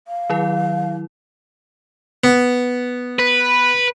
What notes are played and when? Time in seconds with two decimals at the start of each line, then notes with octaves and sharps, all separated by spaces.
0.08 F5
0.30 D#3 F#3 E4
2.24 B3
3.19 B4